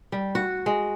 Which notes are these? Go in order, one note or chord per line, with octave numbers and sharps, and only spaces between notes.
G3
F#4
G#3